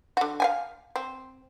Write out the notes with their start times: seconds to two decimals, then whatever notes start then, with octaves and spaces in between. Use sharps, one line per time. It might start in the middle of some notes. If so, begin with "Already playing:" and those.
0.17 D3 F#4
0.40 F5 G5 G#5
0.96 C4